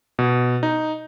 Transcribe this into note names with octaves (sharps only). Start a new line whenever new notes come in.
B2
D#4